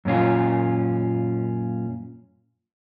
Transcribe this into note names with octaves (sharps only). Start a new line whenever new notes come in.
F#2 A#2 C#4 F4